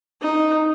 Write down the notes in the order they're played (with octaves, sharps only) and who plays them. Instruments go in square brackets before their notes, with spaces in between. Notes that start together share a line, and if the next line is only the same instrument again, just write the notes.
[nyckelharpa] D#4